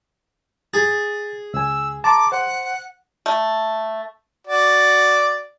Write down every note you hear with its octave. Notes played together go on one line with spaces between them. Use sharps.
G#4 A6
C#2 G#5 E6
A5 A#5 C6 D6
C5 F#5
A3
F#4 D5